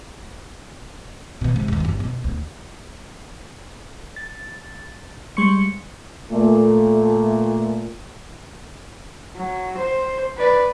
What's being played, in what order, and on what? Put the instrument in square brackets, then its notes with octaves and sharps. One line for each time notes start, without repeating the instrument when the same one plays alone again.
[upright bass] B2 E3
G#2 C3
E2 D#3
G1 F#2
B2
D2
[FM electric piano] A6
G3 G#3 C6 C#6 C#7
[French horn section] A#2 A3
[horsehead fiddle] F#3
C5
B4 D5